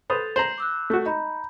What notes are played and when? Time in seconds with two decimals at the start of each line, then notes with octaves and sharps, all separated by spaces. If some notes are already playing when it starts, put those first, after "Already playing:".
0.10 A4 B4 C5 D#6 A6 F7
0.36 C5 A#5 C7 F#7
0.58 D6 E6 F#6
0.90 A3 F#4
1.06 D#4 A#5 B5 G6